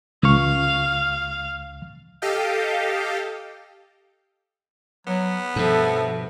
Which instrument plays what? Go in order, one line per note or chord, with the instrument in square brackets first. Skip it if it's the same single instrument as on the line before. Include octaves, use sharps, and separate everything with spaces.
[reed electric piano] C#2 C#6 [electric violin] F5
[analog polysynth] G4 A4 D#5 F5 G5
[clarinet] F#3 [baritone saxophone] B3
[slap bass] G2 B2 [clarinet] F3 [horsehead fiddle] A4 E5